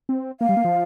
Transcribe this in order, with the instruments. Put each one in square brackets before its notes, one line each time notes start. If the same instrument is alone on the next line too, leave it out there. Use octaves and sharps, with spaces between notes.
[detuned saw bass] C4
[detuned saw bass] A#3 [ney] F5
[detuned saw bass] G3
A#3
F3